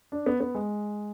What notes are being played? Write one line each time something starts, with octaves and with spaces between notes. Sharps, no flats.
D4
B3
B3
G#3